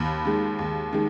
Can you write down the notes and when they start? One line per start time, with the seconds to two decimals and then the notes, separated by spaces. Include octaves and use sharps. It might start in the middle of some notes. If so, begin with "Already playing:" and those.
Already playing: D#2 B5
0.25 D#3 G#3
0.59 D#2
0.93 D#3 G#3